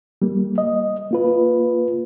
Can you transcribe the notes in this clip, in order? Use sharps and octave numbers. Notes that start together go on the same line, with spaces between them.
G3 A#3
D#5
A#3 F4 B4